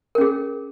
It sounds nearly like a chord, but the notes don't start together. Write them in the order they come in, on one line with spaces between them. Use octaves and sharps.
A#4 C#4 G#4